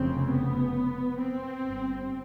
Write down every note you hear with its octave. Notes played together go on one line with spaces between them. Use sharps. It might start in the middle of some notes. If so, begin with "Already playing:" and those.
Already playing: F1 F2 C#3 C4
B3
C4
G1 G2